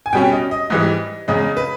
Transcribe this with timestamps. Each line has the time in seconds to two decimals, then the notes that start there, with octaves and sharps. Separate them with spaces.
0.06 G#5
0.13 B2 G3 C#4 G5
0.32 D#5
0.51 D#5
0.70 G#2 E3 G3 D#5
1.28 E2 C#3 G#3 D#5
1.57 B4